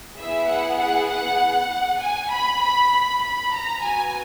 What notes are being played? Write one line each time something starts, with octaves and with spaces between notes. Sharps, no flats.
B3 E4 G#4 E5
F#5
F#5
F#5
G#5
B5
B5
B5
B5
A#5
B3 F#4 G#5